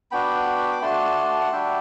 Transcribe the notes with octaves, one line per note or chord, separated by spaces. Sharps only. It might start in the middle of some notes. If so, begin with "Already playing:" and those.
B3 D4 F#4 G5 B5
D6
A3 D4 F#4 A5 C6
F#5
G3 D4 F#4 E5 G5